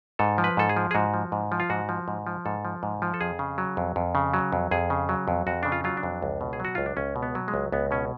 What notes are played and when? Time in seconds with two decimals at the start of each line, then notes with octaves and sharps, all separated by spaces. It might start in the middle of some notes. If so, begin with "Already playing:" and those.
0.19 G#2 A4
0.38 F3
0.44 B4
0.57 G#2 A4
0.69 G#4
0.77 F3
0.91 G#4
0.95 G#2 F#4
1.14 F3
1.32 G#2
1.52 F3
1.60 F4
1.70 G#2 F#4
1.89 F3
2.08 G#2
2.27 F3
2.46 G#2 A4
2.65 F3
2.83 G#2
3.02 F3
3.14 A4
3.21 F2 G#4
3.39 C#3
3.58 F#3
3.77 F2
3.96 F2
4.15 C#3
4.34 F#3
4.52 F2
4.71 F2 G#4
4.90 C#3
5.09 F#3
5.28 F2
5.47 F2 F#4
5.63 C#3 D4
5.72 F4
5.84 F#3 F4
5.97 D4
6.03 F2
6.22 C#2
6.41 B2
6.53 G#4
6.60 F#3 F#4
6.75 C#2 F4
6.86 D4
6.97 C#2 C#4
7.16 B2
7.23 B3
7.35 F#3
7.48 G#3
7.54 C#2
7.72 C#2 B3
7.91 B2 C#4